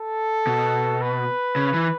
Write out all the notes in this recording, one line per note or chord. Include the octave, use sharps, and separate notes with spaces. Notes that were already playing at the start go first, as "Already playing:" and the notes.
Already playing: A4
B2
B4
C#3
E3